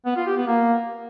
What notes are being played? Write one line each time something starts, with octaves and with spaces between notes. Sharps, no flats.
B3
F4
G4
B3
A#3